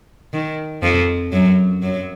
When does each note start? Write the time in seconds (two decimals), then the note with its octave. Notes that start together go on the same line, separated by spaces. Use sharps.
0.34 D#3
0.83 F2 F3
1.32 F#2 F#3
1.83 F#2 F#3